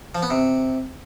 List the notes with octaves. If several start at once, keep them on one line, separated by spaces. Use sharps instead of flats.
F3
B3
C3